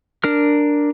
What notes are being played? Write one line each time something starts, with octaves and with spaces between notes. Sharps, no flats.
D4 A#4 F6